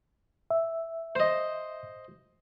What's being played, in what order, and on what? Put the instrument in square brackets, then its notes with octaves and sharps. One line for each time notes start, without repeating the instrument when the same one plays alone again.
[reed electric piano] E5
[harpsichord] C5 D#5